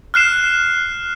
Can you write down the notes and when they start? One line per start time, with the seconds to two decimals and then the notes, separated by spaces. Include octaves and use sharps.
0.14 F6 F#6 C7 E7